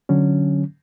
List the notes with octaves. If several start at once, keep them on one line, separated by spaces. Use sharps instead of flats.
D3 F#3 C#4